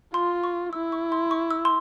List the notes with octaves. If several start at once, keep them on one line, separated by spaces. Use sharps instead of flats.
F4 C6
C#6
E4 E6
C#6
C6
C#6
E6
C6